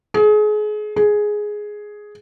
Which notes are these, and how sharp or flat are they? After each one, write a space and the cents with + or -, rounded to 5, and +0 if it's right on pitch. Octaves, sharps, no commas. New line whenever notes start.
G#4 +30
G#4 +5